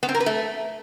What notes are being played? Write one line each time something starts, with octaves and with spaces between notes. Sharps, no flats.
B3
C4
A#4
B4
A3